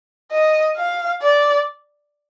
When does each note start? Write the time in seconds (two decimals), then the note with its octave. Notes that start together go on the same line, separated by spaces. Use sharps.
0.32 D#5
0.77 F5
1.22 D5